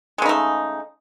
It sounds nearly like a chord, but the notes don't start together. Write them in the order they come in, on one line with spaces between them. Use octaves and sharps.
G#3 C#3 D#4 A3